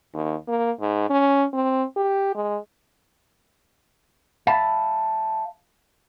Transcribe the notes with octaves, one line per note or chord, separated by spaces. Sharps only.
D#2
A#3
G#2
C#4
C4
G4
G#3
E5 F5 A5 B5